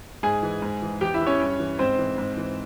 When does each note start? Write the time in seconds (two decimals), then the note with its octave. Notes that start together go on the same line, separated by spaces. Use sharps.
0.23 G#2 G#4 G#5
0.43 E3
0.62 G#2
0.82 E3
1.01 E2 G4 G5
1.14 E4 E5
1.21 E3
1.27 C#4 C#5
1.40 G2
1.59 E3
1.79 G#2 C4 C5
1.98 E3
2.18 G#2
2.37 E3